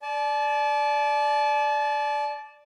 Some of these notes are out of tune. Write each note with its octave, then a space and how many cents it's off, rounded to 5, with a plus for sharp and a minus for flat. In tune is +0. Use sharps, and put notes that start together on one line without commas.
D5 +0 A5 -35